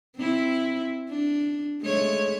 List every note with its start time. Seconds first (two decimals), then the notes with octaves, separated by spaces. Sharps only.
0.16 C4 E4
1.09 D4
1.81 G#3 A3 C#5